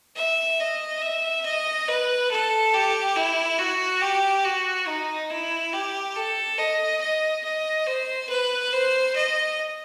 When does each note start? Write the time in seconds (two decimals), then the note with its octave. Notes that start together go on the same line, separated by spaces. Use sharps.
0.16 E5
0.60 D#5
1.02 E5
1.46 D#5
1.88 B4
2.31 A4
2.74 G4
3.16 E4
3.58 F#4
4.01 G4
4.44 F#4
4.87 D#4
5.30 E4
5.73 G4
6.16 A4
6.58 D#5
7.01 D#5
7.44 D#5
7.87 C5
8.29 B4
8.72 C5
9.15 D#5